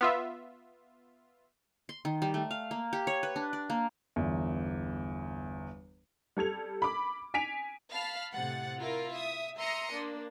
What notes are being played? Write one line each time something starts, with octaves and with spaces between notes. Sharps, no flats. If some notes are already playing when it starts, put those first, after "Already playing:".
B3 F4 E5
C6
D#3
G3
A3
F5
A#3
G4
C#5
B4
D4
D5
A#3
G1 E2
G3 A4 G#6 F7
B5 D6
G#5 B6 D7 F7
F5 A5 B5 F6
A2 C3 F#5 A6
E4 F4 A#4
E5 D#6
E5 A#5 C6 D#6 A#6 C#7
A#3 D4